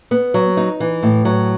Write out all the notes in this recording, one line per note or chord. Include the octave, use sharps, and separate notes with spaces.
B3
F#3
D#4
E3
A2
F#3